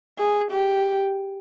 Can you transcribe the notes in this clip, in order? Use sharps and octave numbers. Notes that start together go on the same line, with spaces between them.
G#4
G4